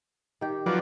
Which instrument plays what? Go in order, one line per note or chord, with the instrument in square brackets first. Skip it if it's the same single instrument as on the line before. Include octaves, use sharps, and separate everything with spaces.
[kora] D#3 G4
[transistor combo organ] F3 F#3 D5 [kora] B4